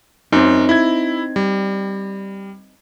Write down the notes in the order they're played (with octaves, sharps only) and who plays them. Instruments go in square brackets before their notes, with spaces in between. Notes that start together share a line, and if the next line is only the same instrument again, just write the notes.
[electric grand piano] F#2 [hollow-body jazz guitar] C4 D#4
[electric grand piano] E4 G#6
G3